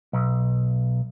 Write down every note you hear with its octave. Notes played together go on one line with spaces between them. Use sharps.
B1